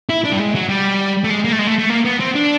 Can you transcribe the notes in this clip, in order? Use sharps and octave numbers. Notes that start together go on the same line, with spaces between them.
E4
D4
G3
G#3
F#3
G3
A3
G#3
A#3
A3
G#3
A3
A3
A#3
B3
C4
D4